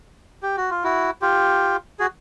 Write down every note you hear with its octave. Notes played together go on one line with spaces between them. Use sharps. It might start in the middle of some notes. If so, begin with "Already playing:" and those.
G4
F#4
F4
E4 F#4
F4 G4
F#4 G#4